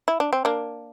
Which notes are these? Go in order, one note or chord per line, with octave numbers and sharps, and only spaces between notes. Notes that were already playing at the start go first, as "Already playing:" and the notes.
E4
D4
C4
A#3 D4